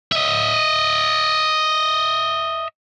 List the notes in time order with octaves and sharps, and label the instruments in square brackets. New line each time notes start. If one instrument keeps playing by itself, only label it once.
[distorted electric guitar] D#5 E5